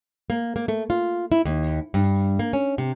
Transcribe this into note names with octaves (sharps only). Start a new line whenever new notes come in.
A#3
A#3
A3
F4
E4
D#2
G2
A#3
C#4
C3